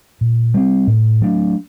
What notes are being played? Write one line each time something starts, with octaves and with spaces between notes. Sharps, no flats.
A#2
G3 C4
A2
F#3 A3 D4